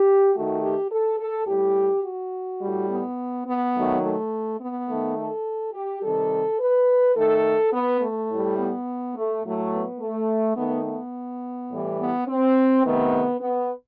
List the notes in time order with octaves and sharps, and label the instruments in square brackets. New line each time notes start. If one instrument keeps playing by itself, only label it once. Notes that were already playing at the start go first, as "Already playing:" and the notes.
Already playing: [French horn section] G4
D#3 A3 F#4
G4
A4
A4
A2 G3 G4
F#4
A2 G3
B3
B3
D#3 F#3 A3
A3
B3
D#3 A3
A4
G4
C3 D#3 G3 A4
B4
D#3 A3 A4
B3
A3
A2 G3
B3
A3
A2 F#3 A3
B3
A3
D#3 A3 B3
B3
A2 E3 G3
B3
C4
C3 D#3 A3 B3
B3